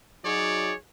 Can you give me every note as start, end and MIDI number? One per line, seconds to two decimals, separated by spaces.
0.24 0.72 54
0.24 0.72 63
0.24 0.72 66
0.24 0.72 68
0.24 0.72 73
0.24 0.72 74